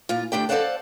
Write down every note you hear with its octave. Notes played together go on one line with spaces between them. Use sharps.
A#2 F4
D2 D4 G4 G5
A4 C5 D5 F5 F#5 A5